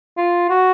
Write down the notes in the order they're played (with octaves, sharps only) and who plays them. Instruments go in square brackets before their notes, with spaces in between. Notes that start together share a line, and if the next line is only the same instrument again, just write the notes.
[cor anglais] F4
F#4